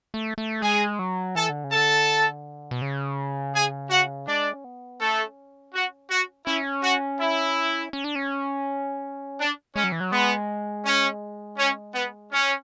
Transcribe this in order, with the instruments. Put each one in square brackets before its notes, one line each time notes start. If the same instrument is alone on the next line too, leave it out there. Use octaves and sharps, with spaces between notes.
[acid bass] A3
A3
[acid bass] G#3 [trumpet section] G#4 G#5
[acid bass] F#3
[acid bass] E3 [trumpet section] A4 A5
[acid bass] D3
C#3
[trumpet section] A4 A5
[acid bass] D3
B2
C#3
[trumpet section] G#4 G#5
F#4 F#5
[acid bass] G#3 [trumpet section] D4 D5
[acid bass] C#4
B3
[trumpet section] A3 A4 [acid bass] C#4
[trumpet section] F#4
F#4
[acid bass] C#4 [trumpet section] E4
[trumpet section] F#4
E4
[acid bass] C#4
D4
C#4
[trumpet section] D4
[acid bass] G#3 [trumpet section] C#4
[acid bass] F#3
E3
F#3
[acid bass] G#3 [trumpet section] B3
[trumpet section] C#4
C#4
B3
C#4